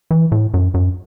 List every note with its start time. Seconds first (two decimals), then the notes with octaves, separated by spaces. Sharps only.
0.11 E3
0.32 A2
0.54 F#2
0.74 F#2